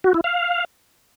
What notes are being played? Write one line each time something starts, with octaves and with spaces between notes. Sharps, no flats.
F#4
E4
F5